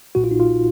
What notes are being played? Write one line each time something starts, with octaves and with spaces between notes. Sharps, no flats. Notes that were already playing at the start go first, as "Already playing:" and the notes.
B1 A#2 F#4
F4
D#4
F4